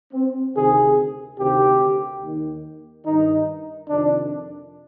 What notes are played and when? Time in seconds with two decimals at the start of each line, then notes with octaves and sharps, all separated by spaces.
0.13 C4
0.54 D2 C3 D#3 G#4
1.38 D2 C3 D#3 G4
2.21 D#2 D#3
3.04 G2 D#3 D#4
3.88 F2 C3 D#3 D4